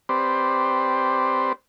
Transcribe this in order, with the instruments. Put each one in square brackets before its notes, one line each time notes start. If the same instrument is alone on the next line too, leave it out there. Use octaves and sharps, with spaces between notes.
[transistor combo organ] C4 G4 B4 C5 D5